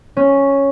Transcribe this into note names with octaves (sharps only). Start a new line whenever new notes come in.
C#4